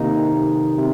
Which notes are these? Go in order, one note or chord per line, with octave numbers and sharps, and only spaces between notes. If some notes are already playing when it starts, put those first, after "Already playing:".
Already playing: C3 D#3 A#3 D#4
C3